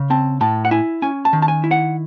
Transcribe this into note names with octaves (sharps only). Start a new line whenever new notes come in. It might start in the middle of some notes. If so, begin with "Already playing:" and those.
Already playing: C#3
C4 A5
A2 A5
F#5
E4 G#5
C#4 G#5
A5
D#3
A5
G#5
E4
F#5